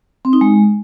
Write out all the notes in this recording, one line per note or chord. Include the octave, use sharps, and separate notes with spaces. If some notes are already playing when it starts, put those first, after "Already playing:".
C4
D#4
G#3